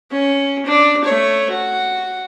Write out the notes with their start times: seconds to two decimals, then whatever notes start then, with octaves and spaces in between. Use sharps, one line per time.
0.11 C#4
0.65 D4
1.04 A3 C#5
1.50 F#4